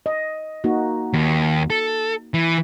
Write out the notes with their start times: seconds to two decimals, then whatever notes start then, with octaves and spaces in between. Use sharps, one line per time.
0.06 D#5
0.64 A#3 D#4 F#4
1.13 D#2
1.70 A4
2.34 E3